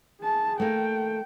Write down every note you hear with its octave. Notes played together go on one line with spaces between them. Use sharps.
G#4 A5
A3 A#3 G5